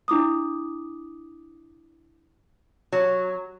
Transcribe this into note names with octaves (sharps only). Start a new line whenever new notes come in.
D4 E4 D6 D#6
F#3